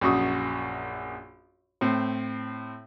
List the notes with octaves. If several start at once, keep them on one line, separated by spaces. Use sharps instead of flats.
A#1 F#2 F#4 C#6 D#6
A2 C4